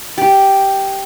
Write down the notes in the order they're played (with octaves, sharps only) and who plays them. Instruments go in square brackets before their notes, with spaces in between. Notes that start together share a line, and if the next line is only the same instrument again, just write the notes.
[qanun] G4